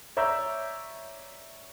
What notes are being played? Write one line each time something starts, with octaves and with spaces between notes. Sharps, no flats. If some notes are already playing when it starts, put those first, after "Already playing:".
C#5 D5 E5 A#5 E6 G6